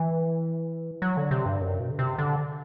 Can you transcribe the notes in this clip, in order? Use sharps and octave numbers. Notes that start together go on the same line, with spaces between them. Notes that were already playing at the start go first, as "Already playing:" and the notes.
Already playing: E3
F#3
D3
C3
G2
F#2
B2
D3
C3
D3